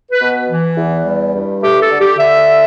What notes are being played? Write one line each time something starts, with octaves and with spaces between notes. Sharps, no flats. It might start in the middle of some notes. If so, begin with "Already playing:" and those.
B4
B2
E3
E2
G3
G2
A3 G4
A4
D3
G4
D3 E5